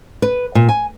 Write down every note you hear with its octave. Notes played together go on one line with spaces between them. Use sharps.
B4
A#2
G#5